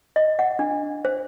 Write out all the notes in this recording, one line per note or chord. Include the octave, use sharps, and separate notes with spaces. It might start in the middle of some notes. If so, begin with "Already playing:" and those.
D#5
F#5
D4
C5